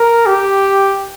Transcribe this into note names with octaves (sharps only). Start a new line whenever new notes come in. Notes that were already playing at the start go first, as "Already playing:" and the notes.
Already playing: A#4
G4